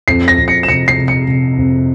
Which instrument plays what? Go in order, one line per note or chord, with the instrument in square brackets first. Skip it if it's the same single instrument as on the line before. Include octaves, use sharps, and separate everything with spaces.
[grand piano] F2 C7
A#6
F2
C#7
E7
C3 C#7
C7
C3
C#7
C3
F2